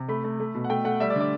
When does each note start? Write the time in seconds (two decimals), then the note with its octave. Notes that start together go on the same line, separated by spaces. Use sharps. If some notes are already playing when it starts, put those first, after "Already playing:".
Already playing: C3
0.08 A3 B5
0.24 A3
0.40 A3
0.55 B2
0.64 F#5
0.69 A3 G5
0.85 A3 F#5
1.00 G3 E5
1.10 D5
1.15 D3
1.20 D5